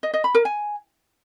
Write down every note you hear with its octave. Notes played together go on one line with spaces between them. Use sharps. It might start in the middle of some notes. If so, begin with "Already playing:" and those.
D#5
D#5
B5
A#4
G#5